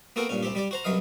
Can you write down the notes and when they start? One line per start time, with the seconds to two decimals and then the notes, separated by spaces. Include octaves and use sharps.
0.16 A#3 B3 F#4 A4 A#4 G5
0.29 G2 A#2 C#4
0.43 C2 C4 G4
0.55 G3 G4 D5
0.71 F#4 C5 A#5
0.84 C2 F#2 F#3 B4 D#5 F5